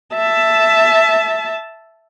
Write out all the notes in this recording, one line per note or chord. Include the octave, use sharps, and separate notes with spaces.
E5 A5